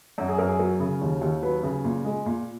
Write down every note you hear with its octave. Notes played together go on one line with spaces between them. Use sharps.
F#2 F#4
G#4
F#2 A#4
G#4
F#3 A#4
C#3
D#2
D#2
F#3 B4
C#3
A#2
G#3
A#2